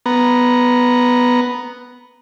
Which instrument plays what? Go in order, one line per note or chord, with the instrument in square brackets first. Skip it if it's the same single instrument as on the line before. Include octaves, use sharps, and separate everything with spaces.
[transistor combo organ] B3 A#5